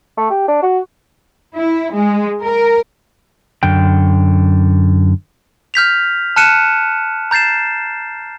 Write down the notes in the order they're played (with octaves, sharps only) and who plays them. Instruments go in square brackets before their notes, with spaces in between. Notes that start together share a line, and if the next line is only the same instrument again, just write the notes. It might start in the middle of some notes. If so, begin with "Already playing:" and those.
[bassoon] A3
G4
D4
F#4
[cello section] E4
G#3
A#4
[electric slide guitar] F#2 D3 G5
[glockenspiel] F6 G6 B6 F7
A5 F6 F#6 C#7 D#7 E7
A#5 G6 A6 C7 E7